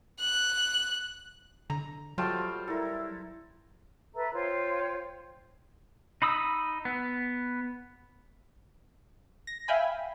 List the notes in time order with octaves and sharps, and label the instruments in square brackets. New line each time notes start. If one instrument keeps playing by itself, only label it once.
[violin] F#6
[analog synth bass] D3 [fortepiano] A#5
[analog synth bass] F#3 [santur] G3 A3 C5 [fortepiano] F4 G5 A5 [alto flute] F#4
[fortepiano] G3 [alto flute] E4 [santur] A4 A#4
[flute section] A4 B4 E5 A#5
F4 C5 C#5 G5
[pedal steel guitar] D#4 B5 D#6 E6
B3
[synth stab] A#6
E5 F5 G5 G#5 B5